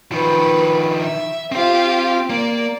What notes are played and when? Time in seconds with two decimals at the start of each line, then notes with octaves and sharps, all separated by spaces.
0.12 D#3 F3 B4
1.01 E5
1.52 C4 F4 G4 C5
2.30 A#3 D5